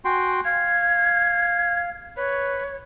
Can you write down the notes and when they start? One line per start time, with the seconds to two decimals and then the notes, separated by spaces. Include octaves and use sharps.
0.05 F#4 G5 G#5 C6
0.45 F5 G#6
2.17 B4 C#5